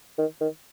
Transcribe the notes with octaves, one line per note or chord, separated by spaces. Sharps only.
D#3
D#3